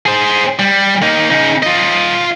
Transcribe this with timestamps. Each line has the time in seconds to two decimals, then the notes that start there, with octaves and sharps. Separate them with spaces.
0.06 G#4 C5
0.59 G3
1.02 A#3 D#4
1.30 C#3 D#4
1.63 F4 D#5